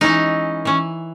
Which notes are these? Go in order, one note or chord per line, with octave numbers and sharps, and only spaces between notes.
E3 G#3 C#4 D#4 E4 D#5
E3 C#4